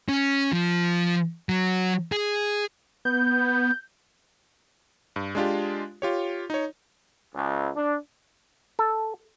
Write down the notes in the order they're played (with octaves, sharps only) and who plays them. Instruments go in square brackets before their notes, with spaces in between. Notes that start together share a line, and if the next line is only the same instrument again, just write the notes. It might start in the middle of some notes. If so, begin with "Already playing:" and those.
[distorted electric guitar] C#4
F3
F#3
G#4
[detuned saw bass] B3 [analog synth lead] G6
[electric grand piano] G2
G#3 D4 F4 G4
F4 G4 C#5
D#4 C#5
[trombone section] C#2
D4
[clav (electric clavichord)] A4